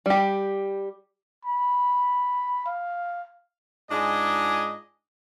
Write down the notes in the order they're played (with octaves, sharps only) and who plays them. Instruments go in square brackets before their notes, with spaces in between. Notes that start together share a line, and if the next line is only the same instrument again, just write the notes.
[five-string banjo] G3 G4
[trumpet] B5
F5
[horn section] G#2 G#3 D4 F4 D#5 G#5